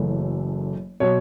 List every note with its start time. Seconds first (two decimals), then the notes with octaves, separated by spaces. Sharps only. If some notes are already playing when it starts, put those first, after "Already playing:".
Already playing: F#1 F#2 E3 A3
1.00 B2 F#3 C#5